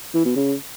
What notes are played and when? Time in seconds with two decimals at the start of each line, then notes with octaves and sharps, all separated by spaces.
0.14 E3
0.25 B2
0.36 C#3